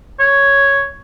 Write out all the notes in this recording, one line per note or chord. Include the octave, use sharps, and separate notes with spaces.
C#5